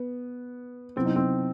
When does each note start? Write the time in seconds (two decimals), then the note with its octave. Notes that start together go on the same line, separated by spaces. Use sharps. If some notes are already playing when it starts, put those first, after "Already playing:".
Already playing: B3
0.96 C3 F#3 B3 C4 E4
1.05 D#4
1.16 C4